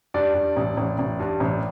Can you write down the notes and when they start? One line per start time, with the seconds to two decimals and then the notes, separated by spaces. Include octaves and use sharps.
0.14 G2 D5
0.34 G2
0.56 A1
0.77 A1
0.99 A1
1.19 G2
1.40 A1